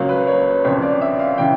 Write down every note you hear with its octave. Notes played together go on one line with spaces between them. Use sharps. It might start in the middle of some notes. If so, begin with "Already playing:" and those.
Already playing: C#2 C#3 F#3 A#3
B4
C#5
G1 F2 C#3 C#5
D5
E5
F5
C#3 E3 G5